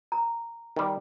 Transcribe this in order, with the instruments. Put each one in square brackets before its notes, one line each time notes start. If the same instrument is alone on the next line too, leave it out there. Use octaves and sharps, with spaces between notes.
[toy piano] A#5
[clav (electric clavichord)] D#3 G3